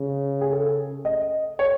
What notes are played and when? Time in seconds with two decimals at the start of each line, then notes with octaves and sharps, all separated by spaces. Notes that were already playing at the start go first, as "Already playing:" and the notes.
Already playing: C#3
0.41 G#4
0.52 A4
1.05 D#5
1.59 C#5